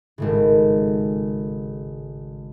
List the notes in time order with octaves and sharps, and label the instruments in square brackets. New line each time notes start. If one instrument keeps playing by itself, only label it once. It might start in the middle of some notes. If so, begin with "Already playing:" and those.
[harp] G#1 A2 C#3